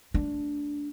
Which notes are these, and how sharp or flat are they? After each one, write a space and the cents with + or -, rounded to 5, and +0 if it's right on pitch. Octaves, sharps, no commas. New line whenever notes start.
A3 +0 D4 -10